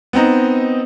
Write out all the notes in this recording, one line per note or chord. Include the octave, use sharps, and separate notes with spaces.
B3 C4 D#4